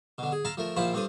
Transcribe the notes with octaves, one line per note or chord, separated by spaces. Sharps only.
B2 D3
G#4
E5 F5 A5 A#5 C6
F3 A3 A#4
A#1 F3 E4 F4 C5 B5
G2 C4 D4 A4 D#6